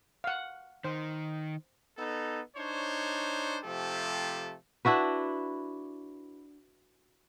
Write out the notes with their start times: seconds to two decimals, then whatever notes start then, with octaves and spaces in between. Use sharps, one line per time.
0.24 F5 F#5
0.84 D#3 C5
1.98 B3 D#4 A4
2.57 D4 D#4 C5 C#5
3.64 C3 F3 A3 G4 A4
4.85 D4 E4 F#4 B4